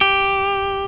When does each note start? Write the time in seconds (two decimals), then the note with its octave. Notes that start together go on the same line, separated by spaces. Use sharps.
0.01 G4